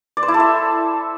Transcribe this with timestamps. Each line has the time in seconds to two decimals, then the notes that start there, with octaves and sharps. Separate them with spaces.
0.17 D5
0.23 C5
0.28 E4
0.34 A4
0.40 E5